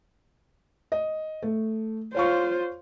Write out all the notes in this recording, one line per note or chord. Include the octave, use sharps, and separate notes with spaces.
D#5
A3
F4 C5 C#5 F5 C#6